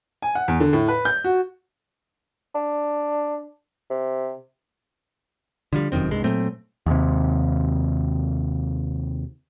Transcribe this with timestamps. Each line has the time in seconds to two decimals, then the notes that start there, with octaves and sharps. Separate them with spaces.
0.22 G#5
0.35 F#5
0.48 E2
0.60 D3
0.73 A2
0.88 B4
1.05 G6
1.24 F#4
2.55 D4
3.90 C3
5.73 D3 F3 G3
5.92 F1 F#2 D#3 C4
6.11 C2 G2 G#3
6.24 A#2 F#3 A3 C4
6.86 D#2 C3